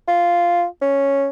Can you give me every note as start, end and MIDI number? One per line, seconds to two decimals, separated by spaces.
0.08 0.64 65
0.82 1.29 61